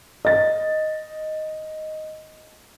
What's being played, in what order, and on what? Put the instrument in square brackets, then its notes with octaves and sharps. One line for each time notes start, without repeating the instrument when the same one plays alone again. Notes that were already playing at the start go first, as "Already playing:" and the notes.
[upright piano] D#5 A6